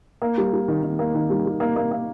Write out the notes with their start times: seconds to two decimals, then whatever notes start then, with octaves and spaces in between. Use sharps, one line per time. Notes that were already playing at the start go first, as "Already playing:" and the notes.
0.22 A#3
0.38 G3
0.53 G3
0.68 D#3
0.83 D#3
0.99 A#3
1.15 D#3
1.30 G3
1.46 G3
1.60 A#3
1.76 A#3
1.91 A#3